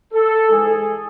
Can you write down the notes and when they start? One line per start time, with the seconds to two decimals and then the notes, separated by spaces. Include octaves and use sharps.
0.13 A4
0.50 G#2 E3 G#3 G#4